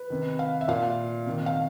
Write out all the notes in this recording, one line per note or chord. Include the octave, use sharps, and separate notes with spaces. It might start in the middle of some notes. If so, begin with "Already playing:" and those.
Already playing: B4
C3 D#3
F5
E5
A#2 F5
C3 D#3
F5